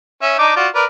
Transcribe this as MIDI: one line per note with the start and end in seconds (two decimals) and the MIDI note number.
0.22 0.37 61
0.22 0.37 76
0.39 0.55 62
0.39 0.55 63
0.39 0.55 86
0.56 0.68 65
0.56 0.68 66
0.56 0.68 74
0.75 0.85 70
0.75 0.85 71
0.75 0.85 74